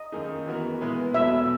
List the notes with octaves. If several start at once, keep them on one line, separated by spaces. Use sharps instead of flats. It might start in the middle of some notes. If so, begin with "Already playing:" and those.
Already playing: D#5
F#2 D#3 A#3 D#4 G#4
E3 B3 F#4 A#4
A#2 G#3 B3 E4 B4
E2 B2 F#3 B3 E5